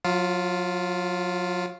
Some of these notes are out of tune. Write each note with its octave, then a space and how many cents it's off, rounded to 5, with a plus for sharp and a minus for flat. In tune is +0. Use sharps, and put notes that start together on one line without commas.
F#3 -35 F4 +0